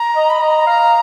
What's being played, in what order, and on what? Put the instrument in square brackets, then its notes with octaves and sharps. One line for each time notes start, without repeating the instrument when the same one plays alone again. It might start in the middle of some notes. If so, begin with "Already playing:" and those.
Already playing: [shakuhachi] A#5
[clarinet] D#5
[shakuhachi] B5
[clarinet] D#5 [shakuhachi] A#5
[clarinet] F5